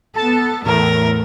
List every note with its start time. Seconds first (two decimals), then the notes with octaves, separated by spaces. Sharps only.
0.16 B3 A4 A5
0.66 E2 A2 A3 A#4